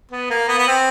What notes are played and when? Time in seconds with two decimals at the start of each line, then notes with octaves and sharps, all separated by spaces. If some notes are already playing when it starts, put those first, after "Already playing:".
0.11 B3
0.30 A#3
0.48 B3
0.58 B3
0.67 C4